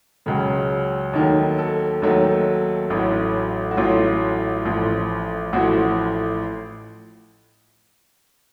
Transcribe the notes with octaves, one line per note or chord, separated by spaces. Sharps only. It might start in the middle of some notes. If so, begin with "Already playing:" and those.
C#2 C#3 F#3
D#2 D#3 F#3 A3
A4
D#2 D#3 F#3 A3
A1 A2 F#3
F#4
A1 A2 F#3 F4
A1 A2 F3
A1 A2 F3 F#4